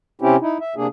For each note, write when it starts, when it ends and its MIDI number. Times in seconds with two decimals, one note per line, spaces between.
0.22 0.36 48
0.22 0.36 60
0.22 0.36 61
0.22 0.36 64
0.22 0.36 67
0.41 0.58 63
0.41 0.58 64
0.61 0.74 76
0.76 0.87 48
0.76 0.87 58
0.76 0.87 62
0.76 0.87 68